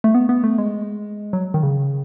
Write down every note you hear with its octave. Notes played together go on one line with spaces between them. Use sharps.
A3
B3
B3
A3
G#3
F#3
D#3
C#3